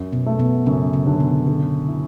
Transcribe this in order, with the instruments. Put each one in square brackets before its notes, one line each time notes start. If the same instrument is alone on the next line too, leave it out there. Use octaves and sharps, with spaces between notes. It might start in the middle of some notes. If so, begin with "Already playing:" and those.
Already playing: [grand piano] F#2
[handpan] B2 B3
[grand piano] A3
[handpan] B2 B3
[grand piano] F#2 [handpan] C#3 C#4
[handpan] C#3 C#4
[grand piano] D3
[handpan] B2 B3
[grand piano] D3
E4